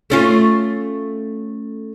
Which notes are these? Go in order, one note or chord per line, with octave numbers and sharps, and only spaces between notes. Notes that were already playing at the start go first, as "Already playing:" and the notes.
A3 C#4 F4